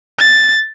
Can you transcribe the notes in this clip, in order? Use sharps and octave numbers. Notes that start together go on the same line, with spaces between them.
A6